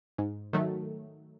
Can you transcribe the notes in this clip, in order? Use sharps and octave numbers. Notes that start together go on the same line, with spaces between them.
G#2
D#3 F#3 A3